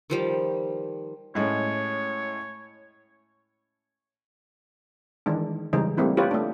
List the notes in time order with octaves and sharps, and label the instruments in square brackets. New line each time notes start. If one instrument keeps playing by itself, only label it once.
[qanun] D#3 F3 G3
[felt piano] A2 G#3 C#4 [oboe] C#5
[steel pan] D#3 E3 G#3 D4
C#3 E3 G3 G#3 D#4
G3 A3 A#3 C4 E4
F4 G4 B4 C#5
A3 D4